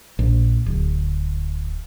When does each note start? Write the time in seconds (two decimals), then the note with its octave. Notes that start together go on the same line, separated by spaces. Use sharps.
0.19 A#1
0.66 D1